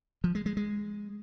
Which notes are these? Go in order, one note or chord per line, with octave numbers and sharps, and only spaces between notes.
F3
G#3
G#3
G#3